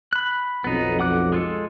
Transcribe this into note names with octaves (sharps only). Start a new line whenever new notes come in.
B5 F#6
B1 F2 B3 D#4
F#5 D6 F#6
G#3 F4 A4